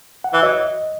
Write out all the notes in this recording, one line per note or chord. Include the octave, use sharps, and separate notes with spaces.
F#5
E3 E5
F#3 D#5